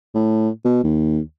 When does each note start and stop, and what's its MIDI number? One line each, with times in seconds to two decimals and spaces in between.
0.14 0.49 45
0.64 0.80 47
0.84 1.19 39